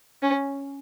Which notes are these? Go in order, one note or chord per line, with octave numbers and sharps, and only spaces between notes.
C#4